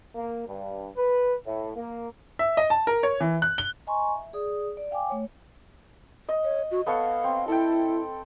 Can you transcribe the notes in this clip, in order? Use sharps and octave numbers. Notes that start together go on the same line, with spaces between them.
A#3
G2
B4
A2
A#3
E5
D#5
A5
A#4
C#5
E3
F#6
G7
D#5 G#5 A#5 C6 C#6
E5
G#4 D5 D#6
D5
F5 G5 G#5 D6
A3 C#5
D#5
C#5
F#4
B3 A4 C#5 F5
C4
E4 A4 G5